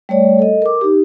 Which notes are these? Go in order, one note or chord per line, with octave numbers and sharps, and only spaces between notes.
G3 A3 C#5 D5
A4 D#5
A#4 D6
D#4 G4